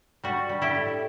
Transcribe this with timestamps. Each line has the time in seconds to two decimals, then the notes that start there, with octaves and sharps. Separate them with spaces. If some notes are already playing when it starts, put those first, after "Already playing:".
0.24 G3 F#4
0.49 G3
0.62 E4 G4
0.75 A2